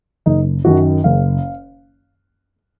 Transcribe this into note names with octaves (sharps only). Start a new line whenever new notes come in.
F#1 D#4
F#2 D#3 F#4
F#1 F5